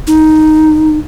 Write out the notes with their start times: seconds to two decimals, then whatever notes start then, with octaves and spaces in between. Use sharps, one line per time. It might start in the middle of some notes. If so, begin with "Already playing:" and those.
0.07 D#4